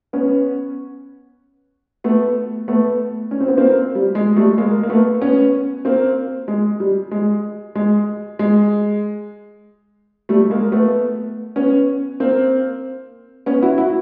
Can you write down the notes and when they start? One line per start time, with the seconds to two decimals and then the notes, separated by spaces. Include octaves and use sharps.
0.13 B3 C#4
2.04 A3 B3
2.68 A3 B3
3.31 C#4
3.40 C4
3.48 B3
3.57 A#3 C4
3.95 G3
4.15 G#3
4.36 G3 A3
4.58 G#3 A#3
4.83 A#3
4.89 A3 B3
5.21 B3 C#4
5.85 A#3 C4
6.48 G#3
6.80 G3
7.11 G#3
7.75 G#3
8.39 G#3
10.29 G3 A3
10.50 G#3 A#3
10.72 A3 B3
11.56 B3 C#4
12.20 A#3 C4
13.46 B3 C#4
13.62 E4 F#4
13.78 E4 F#4